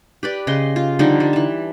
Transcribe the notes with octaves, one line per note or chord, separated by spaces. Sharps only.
G4 B4 D5
C#3 D#5 C6
F4
D3 F3 G3 D#4
G3
E3 A5